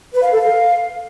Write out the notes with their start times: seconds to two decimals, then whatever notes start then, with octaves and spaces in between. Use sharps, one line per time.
0.14 B4
0.23 F5
0.32 A4
0.41 F5